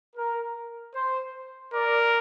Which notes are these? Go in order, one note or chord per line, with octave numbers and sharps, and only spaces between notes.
A#4
C5
A#4 D5